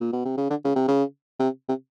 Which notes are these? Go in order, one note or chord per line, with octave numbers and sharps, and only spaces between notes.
A#2
B2
C3
C#3
D3
C#3
C3
C#3
C3
C3